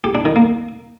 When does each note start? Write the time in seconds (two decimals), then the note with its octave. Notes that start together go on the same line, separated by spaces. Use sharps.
0.04 G4
0.15 D4
0.25 D#3
0.36 A#3